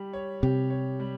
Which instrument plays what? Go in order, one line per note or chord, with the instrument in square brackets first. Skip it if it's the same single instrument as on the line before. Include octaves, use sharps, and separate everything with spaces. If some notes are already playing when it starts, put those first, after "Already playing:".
Already playing: [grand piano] G3 G4
C#5
[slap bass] C3 [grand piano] G4
[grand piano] C#5
G3